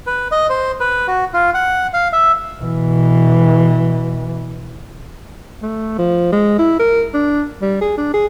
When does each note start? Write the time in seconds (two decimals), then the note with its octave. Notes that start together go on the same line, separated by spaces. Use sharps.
0.07 B4
0.31 D#5
0.50 C5
0.80 B4
1.08 F#4
1.34 F4
1.54 F#5
1.94 F5
2.13 E5
2.61 B2 E3
5.62 A3
5.98 F3
6.32 G#3
6.58 E4
6.79 A#4
7.14 D4
7.62 G3
7.81 G#4
7.97 D4
8.14 G#4